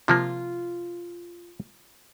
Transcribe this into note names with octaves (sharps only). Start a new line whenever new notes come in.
C3 F3 A#3 F4